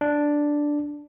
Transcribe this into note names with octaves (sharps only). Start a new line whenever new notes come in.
D4